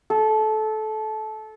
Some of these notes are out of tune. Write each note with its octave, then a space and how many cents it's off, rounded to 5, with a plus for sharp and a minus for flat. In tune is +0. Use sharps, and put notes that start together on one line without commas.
A4 -20